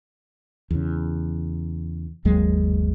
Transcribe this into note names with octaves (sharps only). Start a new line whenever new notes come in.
E2 C#3
G1 D#2 F#3 G#3